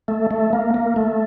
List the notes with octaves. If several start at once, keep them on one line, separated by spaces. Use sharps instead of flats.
A3
A3
A#3
A#3
A3